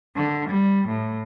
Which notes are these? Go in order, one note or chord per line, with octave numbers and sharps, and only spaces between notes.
D3
G3
A2